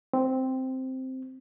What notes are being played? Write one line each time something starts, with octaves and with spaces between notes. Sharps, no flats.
C4